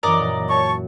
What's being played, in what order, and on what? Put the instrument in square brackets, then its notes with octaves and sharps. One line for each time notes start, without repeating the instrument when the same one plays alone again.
[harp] F#2 E3 [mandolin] A#4 D5 D#5
[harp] A#2
[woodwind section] C#5 A5 C#6